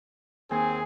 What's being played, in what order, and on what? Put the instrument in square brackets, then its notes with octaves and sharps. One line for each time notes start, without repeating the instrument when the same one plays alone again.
[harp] D#2 G#5 [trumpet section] C4 G#4